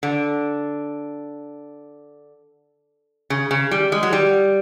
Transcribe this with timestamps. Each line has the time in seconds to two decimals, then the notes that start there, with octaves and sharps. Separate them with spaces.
0.03 D3
3.30 C#3
3.51 C#3
3.71 G3
3.92 G#3
4.03 F#3
4.13 G3